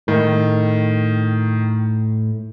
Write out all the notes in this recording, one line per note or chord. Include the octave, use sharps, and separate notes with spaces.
A2 D#3